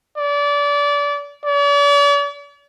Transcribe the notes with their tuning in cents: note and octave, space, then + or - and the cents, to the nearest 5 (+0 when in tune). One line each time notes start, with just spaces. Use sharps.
D5 -25
D5 -45